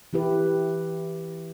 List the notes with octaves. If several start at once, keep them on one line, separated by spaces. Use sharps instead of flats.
E3 E4 G4 B4